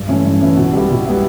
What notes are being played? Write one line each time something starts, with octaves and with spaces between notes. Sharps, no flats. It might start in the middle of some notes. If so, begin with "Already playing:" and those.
Already playing: G2
E3 A3 C#4
G2
E3 A3 C#4
B2
G3 B3 E4
B2
G3 B3 E4